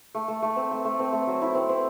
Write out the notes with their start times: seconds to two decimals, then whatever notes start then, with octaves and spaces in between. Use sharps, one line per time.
0.15 A3
0.28 A3
0.42 A3
0.56 C4
0.71 A3
0.85 A3
0.99 C4
1.13 A3
1.27 F#3
1.42 E4
1.55 C4
1.69 C4